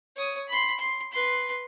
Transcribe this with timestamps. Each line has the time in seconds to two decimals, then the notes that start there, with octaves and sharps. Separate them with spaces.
0.16 C#5 D#6
0.49 B5 C6
0.79 C6
1.13 B4 C6